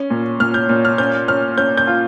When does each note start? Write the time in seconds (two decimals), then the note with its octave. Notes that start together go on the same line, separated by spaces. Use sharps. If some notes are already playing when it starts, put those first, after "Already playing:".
Already playing: C#4
0.10 A#2
0.40 A#2 F6
0.54 G6
0.69 A#2
0.85 F6
0.98 C#4 G6
1.28 C#4 F6
1.58 C#4 G6
1.77 G6
1.87 F4